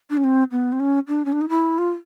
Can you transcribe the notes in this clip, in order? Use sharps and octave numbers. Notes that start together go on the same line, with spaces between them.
D4
C#4
C4
B3
C4
C#4
D4
C#4
D4
D#4
E4
F4